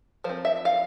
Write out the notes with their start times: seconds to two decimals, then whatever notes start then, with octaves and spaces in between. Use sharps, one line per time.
0.24 F3 C5
0.29 C4
0.45 E5
0.65 F5